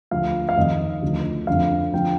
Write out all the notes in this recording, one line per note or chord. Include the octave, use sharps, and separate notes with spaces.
D2 D3 F3 F5
F5
F2 D#3 D#5
D2 D3 F3
F2 D3 F3 F5
D3 F3 G5